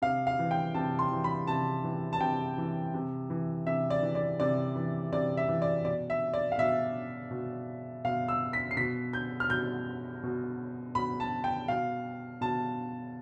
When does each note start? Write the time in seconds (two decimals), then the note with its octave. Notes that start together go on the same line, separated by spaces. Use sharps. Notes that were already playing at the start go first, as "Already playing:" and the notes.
0.02 C3 F5
0.27 F5
0.39 E3
0.51 G5
0.74 C3 A5
0.99 C6
1.12 E3
1.24 B5
1.47 C3 A5
1.84 E3
2.13 A5
2.20 C3 G5
2.58 E3
2.94 C3
3.30 E3
3.66 C3 E5
3.90 D5
4.03 E3
4.15 D5
4.40 C3 D5
4.75 E3
5.13 C3 D5
5.37 E5
5.48 E3
5.62 D5
5.85 B2 D5
6.10 E5
6.34 D5
6.52 F5
6.58 B2 E5
7.31 B2
8.05 B2 F5
8.28 E6
8.53 B6
8.71 C7
8.77 B2 B6
9.13 G6
9.40 F6
9.50 B2 G6
10.23 B2
10.95 B2 B5
11.20 A5
11.44 G5
11.68 B2 F5
12.41 B2 A5